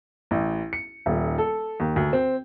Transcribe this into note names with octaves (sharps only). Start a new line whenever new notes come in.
A1
C#7
D#1
A4
D#2
D2
C4